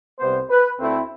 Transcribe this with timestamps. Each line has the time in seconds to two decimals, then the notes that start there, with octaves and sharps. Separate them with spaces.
0.19 C2 C3 G3 B3 C5
0.50 B4
0.79 D2 D3 A3 C4 E4